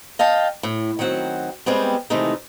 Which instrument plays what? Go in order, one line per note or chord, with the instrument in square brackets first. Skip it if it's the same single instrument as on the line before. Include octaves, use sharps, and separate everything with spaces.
[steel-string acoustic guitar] D#5 F5 G5 A5
A2
D#3 F#3 C4 F#5
G3 G#3 B3 C4
C3 D#3 E3 G#3 A3 D#4